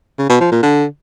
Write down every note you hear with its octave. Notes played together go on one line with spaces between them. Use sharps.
C#3
B2
F3
A#2
D3